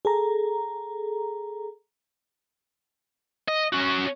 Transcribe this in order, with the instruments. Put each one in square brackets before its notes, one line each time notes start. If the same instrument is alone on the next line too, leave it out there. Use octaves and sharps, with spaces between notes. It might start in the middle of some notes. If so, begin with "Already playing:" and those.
[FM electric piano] G#4 A4 A#5
[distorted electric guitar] D#5
C#4 F#4